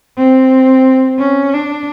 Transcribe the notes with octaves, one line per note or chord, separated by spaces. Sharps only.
C4
C#4
D4